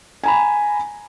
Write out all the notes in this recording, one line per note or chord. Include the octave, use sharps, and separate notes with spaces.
G#5 A#5 B5